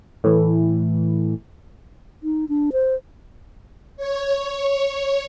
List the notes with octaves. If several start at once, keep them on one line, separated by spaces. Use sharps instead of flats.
A2 E3
D#4
D4
C5
C#5